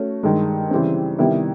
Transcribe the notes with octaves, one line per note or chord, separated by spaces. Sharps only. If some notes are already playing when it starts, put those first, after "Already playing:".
Already playing: A3 C#4 F#4
G2 D#3 G#3
C#3 E3 G3 C4
C3 D#3 G3 B3 E4